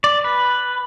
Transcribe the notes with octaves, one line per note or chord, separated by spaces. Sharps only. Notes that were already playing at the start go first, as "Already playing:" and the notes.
D5
B4